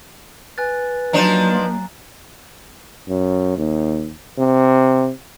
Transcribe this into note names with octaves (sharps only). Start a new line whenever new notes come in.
B4 G#5 F#6 A6
F3 F#3 A#3 D4 D#4 A#5
F#2
D#2
C3